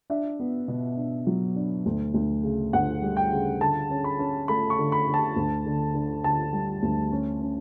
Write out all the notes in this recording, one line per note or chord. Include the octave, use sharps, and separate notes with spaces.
D4 E5
B3
B2
D4
F#3
D4
D2
D2
C#3
D2 F#5
G3
G5
C#3
D3 A5
C#4
B5
C#4
A3 B5
C#6
D3
B5
D3
A5
D2
D3
D3
D3 A5
G3
D2
C#4
C#4